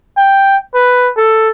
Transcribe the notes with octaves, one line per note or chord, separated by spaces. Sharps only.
G5
B4
A4